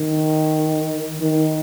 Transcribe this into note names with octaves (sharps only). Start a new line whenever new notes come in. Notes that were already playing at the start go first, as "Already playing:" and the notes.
Already playing: D#3
D#3